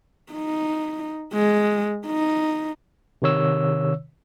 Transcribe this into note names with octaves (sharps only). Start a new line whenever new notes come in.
D#4
G#3
D#4
C3 D#3 C#5 E6